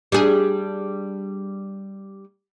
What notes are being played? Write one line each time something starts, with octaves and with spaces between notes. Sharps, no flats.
G3 D4 G#4